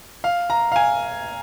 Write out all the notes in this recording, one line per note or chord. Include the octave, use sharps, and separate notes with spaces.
F5
A#5
F5
G#5